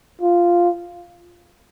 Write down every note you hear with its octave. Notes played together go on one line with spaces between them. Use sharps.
F4